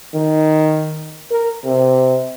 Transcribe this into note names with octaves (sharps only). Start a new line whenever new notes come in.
D#3
A#4
C3